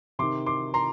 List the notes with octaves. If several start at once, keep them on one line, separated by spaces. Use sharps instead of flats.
C3 D#3 C6 D6
C6 D6
A#5 C6